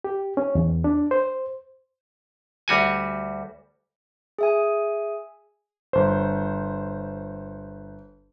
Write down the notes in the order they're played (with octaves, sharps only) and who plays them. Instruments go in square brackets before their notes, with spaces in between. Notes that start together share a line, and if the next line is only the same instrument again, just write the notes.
[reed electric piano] G4
C#4
E2
D4
C5
[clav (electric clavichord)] D2 G3 F#4 G#5
[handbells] G#4 E5 G#5
[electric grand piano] G1 C5